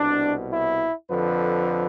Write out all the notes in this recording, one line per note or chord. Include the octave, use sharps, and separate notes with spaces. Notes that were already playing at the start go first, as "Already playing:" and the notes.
Already playing: C2 B2 D4
E4
F2 D3 F3 B4